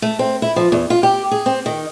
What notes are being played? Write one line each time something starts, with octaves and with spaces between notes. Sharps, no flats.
A3
C4
E4
F3
E2
F4
G4
G#4
C4
D#3